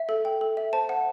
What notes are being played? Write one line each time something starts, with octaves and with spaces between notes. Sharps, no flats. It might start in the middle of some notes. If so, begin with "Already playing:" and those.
Already playing: E5
A4
G5
A4
E5
C5 A5
F#5